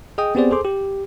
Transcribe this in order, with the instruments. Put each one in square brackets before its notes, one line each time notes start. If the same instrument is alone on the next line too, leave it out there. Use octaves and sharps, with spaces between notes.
[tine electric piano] G#4 D#5 G5 D#6
B3 C4 G4 G#4 C5 D5
G#4 A4 C5 C6 D6
G4